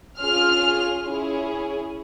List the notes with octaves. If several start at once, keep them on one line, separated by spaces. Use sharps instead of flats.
C#4 F4 G#4 F6
C#4 E4 G#4